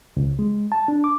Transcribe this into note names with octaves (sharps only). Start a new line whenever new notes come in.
C#2
G#3
A5
D4
D6